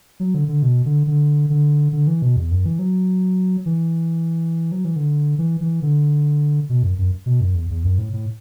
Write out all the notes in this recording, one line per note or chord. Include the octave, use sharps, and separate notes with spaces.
F#3
D3
D3
B2
D3
D3
D3
D3
E3
B2
E2
F#2
E3
F#3
E3
F#3
E3
D3
E3
E3
D3
B2
F#2
F#2
B2
F#2
E2
E2
F#2
A2
A2